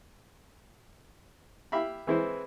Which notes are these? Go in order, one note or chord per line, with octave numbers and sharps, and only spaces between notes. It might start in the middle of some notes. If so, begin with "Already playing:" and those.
E4 G4 E5 F5 B5
E3 G#3 C4 E4 B4 C5